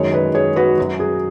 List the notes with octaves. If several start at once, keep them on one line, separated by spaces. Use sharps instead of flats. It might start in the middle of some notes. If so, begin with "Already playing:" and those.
Already playing: F#2 D#3 G#3 G#4 C#5
B4 D#5
G#4 C#5
F#4 B4
F#2 F#3
G#4